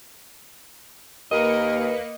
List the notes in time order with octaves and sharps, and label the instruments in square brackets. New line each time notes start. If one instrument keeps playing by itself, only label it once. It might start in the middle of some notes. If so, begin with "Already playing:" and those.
[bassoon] D#2 [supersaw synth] A#3 B4 C#7 [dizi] A#4 [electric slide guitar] D#5